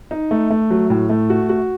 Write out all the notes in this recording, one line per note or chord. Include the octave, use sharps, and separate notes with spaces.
D#4
A3
A3
F#3
A2
A3
F#4
F#4